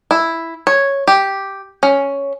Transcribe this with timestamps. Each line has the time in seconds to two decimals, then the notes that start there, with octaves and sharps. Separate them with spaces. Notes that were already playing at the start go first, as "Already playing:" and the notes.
0.11 E4
0.67 C#5
1.08 G4
1.83 C#4